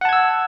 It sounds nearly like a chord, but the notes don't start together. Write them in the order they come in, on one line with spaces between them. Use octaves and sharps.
F#5 A5 G#6 E6